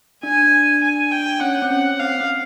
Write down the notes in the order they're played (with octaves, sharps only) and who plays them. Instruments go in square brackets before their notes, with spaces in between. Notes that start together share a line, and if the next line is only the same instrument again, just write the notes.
[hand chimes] D4 [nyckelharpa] G#5
[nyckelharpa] G#5
G5
[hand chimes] C#4 [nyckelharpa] F#5
[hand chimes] C4
[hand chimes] C#4 [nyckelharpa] F#5
[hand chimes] C4 [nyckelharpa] F5
[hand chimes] C4